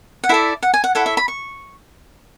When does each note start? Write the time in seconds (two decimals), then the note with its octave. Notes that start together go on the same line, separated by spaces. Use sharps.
0.24 F#5
0.29 E4 A4 D5 E5
0.63 F#5
0.74 G#5
0.84 F#5
0.95 E4 A4 C#5 F#5
1.06 E5
1.17 B5
1.28 C#6